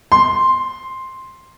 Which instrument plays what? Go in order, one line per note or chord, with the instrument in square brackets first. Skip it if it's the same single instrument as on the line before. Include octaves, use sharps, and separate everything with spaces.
[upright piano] C6